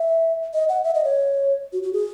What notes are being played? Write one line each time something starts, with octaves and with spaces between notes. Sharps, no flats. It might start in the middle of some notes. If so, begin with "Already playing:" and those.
Already playing: E5
D#5
F#5
E5
D#5
C#5
F#4
F#4
G#4